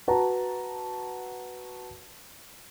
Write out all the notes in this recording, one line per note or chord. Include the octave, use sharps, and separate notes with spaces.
F#4 B4 A5 A#5